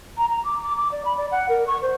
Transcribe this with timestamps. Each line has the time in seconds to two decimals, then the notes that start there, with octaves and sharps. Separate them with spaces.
0.17 A#5
0.29 A#5
0.44 D6
0.62 D6
0.76 D6
0.91 D5
1.05 B5
1.16 D5
1.31 F#5
1.48 A#4
1.67 C#6
1.82 C5